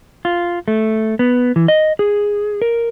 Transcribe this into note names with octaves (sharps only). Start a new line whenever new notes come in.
F4
A3
B3
E3
D#5
G#4
A#4